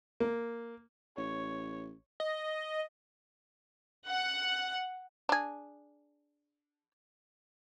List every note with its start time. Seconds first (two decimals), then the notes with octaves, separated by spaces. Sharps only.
0.20 A#3
1.17 A1 C#5
2.20 D#5
4.08 F#5
5.29 D4 G#4